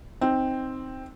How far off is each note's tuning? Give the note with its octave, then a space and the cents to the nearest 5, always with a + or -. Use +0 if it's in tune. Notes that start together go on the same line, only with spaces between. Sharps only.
C4 +0 D#4 +0